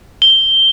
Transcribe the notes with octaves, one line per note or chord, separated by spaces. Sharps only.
G7